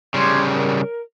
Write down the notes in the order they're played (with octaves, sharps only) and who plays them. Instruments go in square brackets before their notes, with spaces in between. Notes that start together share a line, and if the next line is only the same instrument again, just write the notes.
[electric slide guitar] C#3 G3 [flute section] G4 C6 G#6
[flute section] A#4